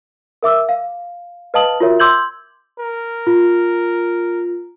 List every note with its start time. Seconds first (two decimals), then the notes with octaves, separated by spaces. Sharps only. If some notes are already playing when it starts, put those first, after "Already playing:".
0.43 A#4 E5 D6 E6
0.69 F5
1.54 B4 D#5 F5 A5 D#6 F#7
1.80 F4 F#4 A#4 C#5 E5
2.00 C6 D6 E6 G6 G#6 F#7
2.80 A#4
3.27 F4